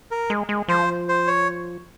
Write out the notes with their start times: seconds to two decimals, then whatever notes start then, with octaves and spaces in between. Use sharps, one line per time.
0.11 A#4
0.30 G#3
0.49 G#3
0.68 F3 C5
1.09 C5
1.27 C#5